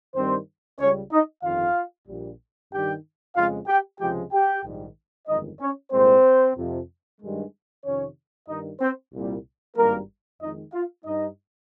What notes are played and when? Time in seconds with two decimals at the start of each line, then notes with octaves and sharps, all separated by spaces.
0.14 G2 D#3 G3 C4 C5
0.79 C#2 C#3 G3 C#4 C#5
1.11 D#4 D#5
1.43 G1 F2 D#3 F4 F5
2.08 A#1 A#2 G3
2.71 G2 D#3 G3 G4 G5
3.35 F2 C#3 G#3 F4 F5
3.67 G4 G5
4.00 C#2 C3 F3 G#3 G4 G5
4.32 G4 G5
4.63 A#1 G#2 D#3 G3
5.28 G1 F2 D#3 G#3 D#4 D#5
5.60 C#4 C#5
5.92 C2 A#2 G#3 C4 C5
6.56 F2 C3 F3
7.21 G2 D#3 G#3
7.84 F2 C3 D#3 C#4 C#5
8.49 G2 D#3 G3 D#4 D#5
8.81 C4 C5
9.13 C2 A#2 G3
9.76 G#1 G2 G3 A#3 A#4
10.40 F2 D#3 G#3 D#4 D#5
10.73 F4 F5
11.05 G2 G3 D#4 D#5